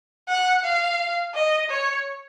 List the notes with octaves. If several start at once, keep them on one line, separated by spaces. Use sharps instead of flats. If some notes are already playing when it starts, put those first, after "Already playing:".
F#5
F5
D#5
C#5